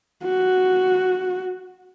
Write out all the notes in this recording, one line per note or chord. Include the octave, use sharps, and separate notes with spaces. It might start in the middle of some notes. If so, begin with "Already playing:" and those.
F#4